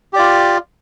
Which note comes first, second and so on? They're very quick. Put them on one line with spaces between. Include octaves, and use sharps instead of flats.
G4 D5 F4